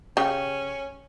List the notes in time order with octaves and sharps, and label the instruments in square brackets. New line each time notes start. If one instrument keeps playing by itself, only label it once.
[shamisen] C#3 [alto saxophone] C#4 [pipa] G4 G5